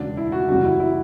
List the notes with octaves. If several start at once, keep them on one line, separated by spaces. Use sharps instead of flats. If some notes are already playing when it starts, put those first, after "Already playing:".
Already playing: E1 D2 C#3 D4
E4
F#4
F#1 E2 C#3 G3 F#4
E4
E4